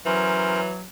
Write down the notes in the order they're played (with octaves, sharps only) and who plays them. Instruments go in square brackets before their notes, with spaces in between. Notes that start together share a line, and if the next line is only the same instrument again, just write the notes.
[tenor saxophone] E3 [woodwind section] F#3 [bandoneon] C#4 A#4 C5